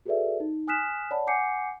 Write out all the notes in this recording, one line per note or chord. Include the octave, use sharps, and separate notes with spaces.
F#4 G#4 A4 B4 D5 E5
D#4
G#5 D#6 F6 F#6 B6 E7
C#5 D5 F#5 A5 B5
F#5 G#5 D6 G6 C7 C#7